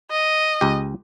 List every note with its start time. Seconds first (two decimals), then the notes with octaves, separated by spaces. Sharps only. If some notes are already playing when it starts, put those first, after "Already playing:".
0.11 D#5
0.61 C#2 G4